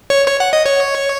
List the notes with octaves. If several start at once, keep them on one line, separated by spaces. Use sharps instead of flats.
C#5
C#5
F#5
D#5
C#5